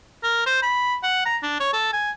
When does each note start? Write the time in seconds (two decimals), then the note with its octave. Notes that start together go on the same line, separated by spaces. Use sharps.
0.23 A#4
0.46 C5
0.62 B5
1.03 F#5
1.26 A#5
1.42 D4
1.60 C#5
1.73 A4
1.93 G#5